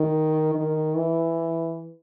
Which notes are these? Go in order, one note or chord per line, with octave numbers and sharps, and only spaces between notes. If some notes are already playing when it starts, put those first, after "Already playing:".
Already playing: D#3
D#3
E3